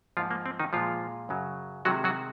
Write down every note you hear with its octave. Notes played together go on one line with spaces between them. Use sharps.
G#2 F3 A#3 F4
A#3
C4
D#3 D#4
A#2 F3 G#3 F4
F#2 C#3 F#3
C3 D#3 F#3 G#3 F#4
F#3 F#4